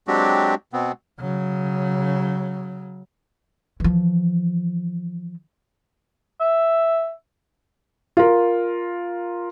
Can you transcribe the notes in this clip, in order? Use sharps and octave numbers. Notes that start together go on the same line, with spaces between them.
F#3 G#3 C4 D4 F#4 G4
B2 B3 C4
C#3 F#3
E3 F3
E5
F4 A#4